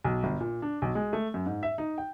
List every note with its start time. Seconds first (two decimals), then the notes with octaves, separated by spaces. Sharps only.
0.04 B1
0.23 G1
0.40 A#2
0.62 D4
0.82 B1
0.95 G#3
1.13 A3
1.34 F#2
1.46 G#2
1.63 E5
1.78 D#4
1.98 G5